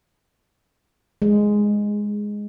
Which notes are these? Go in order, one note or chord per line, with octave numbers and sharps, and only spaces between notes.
G#3